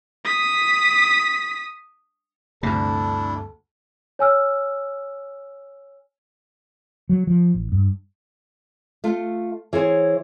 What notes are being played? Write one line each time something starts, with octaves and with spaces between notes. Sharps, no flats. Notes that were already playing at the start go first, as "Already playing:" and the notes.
D#6 B6
D2 G2 C3 D4 E4 A4
C#5 G#5 E6 F6
F#3
F3
A1
G2
A3 F4
E3 G#4 C5 C#5